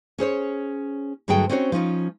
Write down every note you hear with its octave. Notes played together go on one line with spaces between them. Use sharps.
C#4 G#4 C5 C#5
G2 D3 F#3 A3 G#4 G5
C4 C#4 D#4 F#4 C5 C#5
F3 C#4 D#4 F4